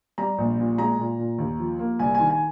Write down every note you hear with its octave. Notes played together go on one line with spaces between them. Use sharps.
G3 A#5
A#1
A#2
G#3 A#5
A#2
A#2
D#2
F3
A#3
C2 G#5
G#5
D#3
G#5